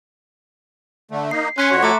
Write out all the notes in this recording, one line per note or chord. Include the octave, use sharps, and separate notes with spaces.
D3 A3
A#3 D#4 C7
C#4 G#5 C6 F#6 B6 C#7
F2 F#4 C#5 C6 C#6
A3 E5 A#5 D6